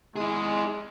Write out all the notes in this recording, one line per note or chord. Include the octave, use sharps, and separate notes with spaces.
G#3 E4 G#4